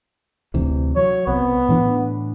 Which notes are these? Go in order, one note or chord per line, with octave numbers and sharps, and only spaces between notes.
D2 C3 E3
F#3 C#5
C2 B3
A2 E3 D4